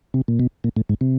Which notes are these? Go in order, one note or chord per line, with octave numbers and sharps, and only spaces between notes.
C3
A#2
B2
A#2
A2
G#2
C3